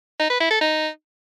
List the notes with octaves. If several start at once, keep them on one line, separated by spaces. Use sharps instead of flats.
D#4
B4
E4
A4
D#4